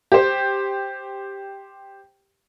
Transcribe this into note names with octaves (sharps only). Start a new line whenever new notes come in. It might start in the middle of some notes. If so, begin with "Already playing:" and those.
G4 C5